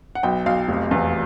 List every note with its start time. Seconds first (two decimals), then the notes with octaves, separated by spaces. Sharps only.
0.15 F#5
0.23 B1 G5
0.46 B1 F5
0.68 F1
0.91 E2